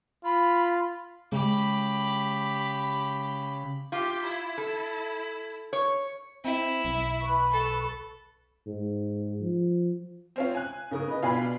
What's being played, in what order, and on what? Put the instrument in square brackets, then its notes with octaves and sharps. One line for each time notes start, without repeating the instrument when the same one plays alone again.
[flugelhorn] F4 [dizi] B5
[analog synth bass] C#3 [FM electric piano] G#3 [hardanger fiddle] G4 B5
[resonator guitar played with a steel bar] F4 [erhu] G4
[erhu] E4
[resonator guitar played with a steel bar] A4
C#5
[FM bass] C4 [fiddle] E4
[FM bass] B1
[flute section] B4 B5 C#6
[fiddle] A4
[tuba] G#2
F3
[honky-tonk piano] C4 C#4 F4
G#5 F#6
[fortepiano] C#3 A#4 D#6
B4 D#5
[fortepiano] B2 G#5 B5 [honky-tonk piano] D4 F4